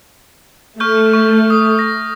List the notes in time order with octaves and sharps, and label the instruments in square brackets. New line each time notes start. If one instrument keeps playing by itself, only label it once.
[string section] A3 [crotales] C#6 F6 G6
[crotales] C#6
D#6
A#6